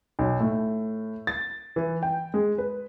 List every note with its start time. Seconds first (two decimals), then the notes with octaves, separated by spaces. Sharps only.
0.19 B1
0.40 A2
1.27 A6
1.76 E3
2.03 G5
2.34 G#3
2.58 B4